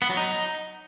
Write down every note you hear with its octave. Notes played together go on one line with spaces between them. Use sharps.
B3
F#3
D#4